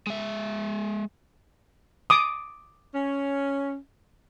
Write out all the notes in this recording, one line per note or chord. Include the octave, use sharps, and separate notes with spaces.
G#3 E5
D6 D#6
C#4